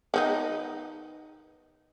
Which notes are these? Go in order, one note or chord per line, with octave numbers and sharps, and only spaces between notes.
D#3 B3 D#4